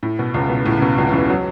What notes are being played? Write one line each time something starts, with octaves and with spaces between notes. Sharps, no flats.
A2
B2
C#2 C#3
B2
A2
C#3
B2
C#2 C#3
C#3
E2 E3
F#3